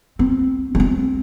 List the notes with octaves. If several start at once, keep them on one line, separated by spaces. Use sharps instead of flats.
C4
A3
C4